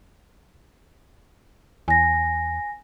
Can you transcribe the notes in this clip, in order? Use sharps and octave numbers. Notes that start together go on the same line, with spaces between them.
E2 G#5 A#6